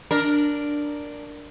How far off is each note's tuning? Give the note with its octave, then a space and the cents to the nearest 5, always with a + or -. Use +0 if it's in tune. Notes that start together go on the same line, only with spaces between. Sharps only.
D4 +0 A#4 +0